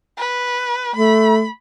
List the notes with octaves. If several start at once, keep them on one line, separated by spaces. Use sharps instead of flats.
B4
A3 B5